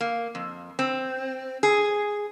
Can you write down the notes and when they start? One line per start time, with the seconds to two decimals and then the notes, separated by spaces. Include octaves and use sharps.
0.01 A#3
0.35 F2
0.79 C4
1.63 G#4